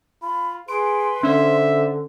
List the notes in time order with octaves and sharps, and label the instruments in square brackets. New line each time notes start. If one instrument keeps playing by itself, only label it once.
[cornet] F4 [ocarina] B5
[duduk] G#4 [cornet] B4 [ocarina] C6 [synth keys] D7
[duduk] D3 [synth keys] C#4 D4 C5 [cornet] E5